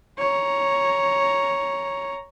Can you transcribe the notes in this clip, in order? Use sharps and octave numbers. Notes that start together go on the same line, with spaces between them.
C#5 A#5